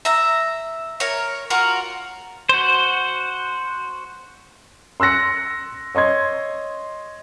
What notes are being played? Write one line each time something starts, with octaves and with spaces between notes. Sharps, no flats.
E5 A#5
A#4 C#5
F4 F#4 A#4 C#6
F#4 C5
C6 E6 F#6 A#6 C#7
C#5 D#5 C6 G#6